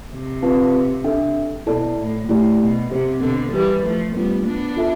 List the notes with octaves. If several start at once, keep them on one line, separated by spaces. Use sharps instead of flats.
C3
C4 F4 B4 F5 A5
D4 A4 E5 G5
B2 E4 A4 D5 A5
A2
A2 A3 E4 G4 D5
B2
C3 C4 G4 C5
B2 D3
E3 G3 E4 G4 B4
F3 A3
G3 A3 B3 D4 F4 C5
B3 D4
F4 A4 E5 A5